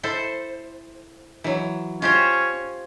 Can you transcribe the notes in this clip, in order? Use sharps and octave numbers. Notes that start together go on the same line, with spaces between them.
E4 A4 C5
E3 F#3
C#4 F4 G4 C5